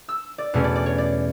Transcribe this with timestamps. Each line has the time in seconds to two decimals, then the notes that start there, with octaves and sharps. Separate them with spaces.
0.08 E6
0.38 D5
0.54 E2 B2 A3 C#4
0.64 D5
0.76 D5
0.86 C#5
0.98 D5